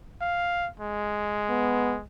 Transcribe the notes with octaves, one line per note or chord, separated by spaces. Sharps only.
F5
G#3
B3